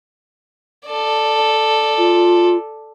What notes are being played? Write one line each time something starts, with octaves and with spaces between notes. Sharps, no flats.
A4 D5
F4